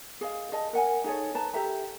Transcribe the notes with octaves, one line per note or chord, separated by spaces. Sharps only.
G#4 D#5 F5
G#4 D#5 A5
A#4 F#5 G#5
D#4 G#4 A4 C#5
B4 A5 A#5
G4 A4 E5 A#5